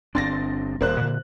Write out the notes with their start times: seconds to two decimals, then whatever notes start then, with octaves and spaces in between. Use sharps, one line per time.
0.15 G1 C4 D4 C6 A6 A#6
0.81 D#1 A#3 C5 F#6
1.01 A#2 D3